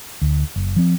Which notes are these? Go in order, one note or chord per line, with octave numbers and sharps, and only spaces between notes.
D2
F#1
F3 C4